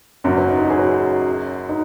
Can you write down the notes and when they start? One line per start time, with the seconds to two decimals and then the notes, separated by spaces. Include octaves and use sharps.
0.24 F#1 F#2 F#3
0.37 C#4
0.51 D#4
0.63 F#4
0.70 G#4
0.78 C#4 F#4
1.69 D#4